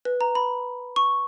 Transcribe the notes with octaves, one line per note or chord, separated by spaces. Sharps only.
B4
A#5
B5
C#6